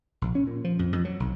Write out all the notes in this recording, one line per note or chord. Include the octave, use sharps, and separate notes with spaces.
A#1
C#4
A#2
F3
F2
F2
F#3
B1